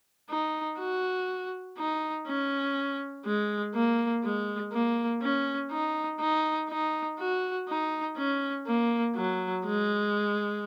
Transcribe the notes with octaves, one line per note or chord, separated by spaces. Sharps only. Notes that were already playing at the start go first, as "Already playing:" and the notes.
D#4
F#4
D#4
C#4
G#3
A#3
G#3
A#3
C#4
D#4
D#4
D#4
F#4
D#4
C#4
A#3
F#3
G#3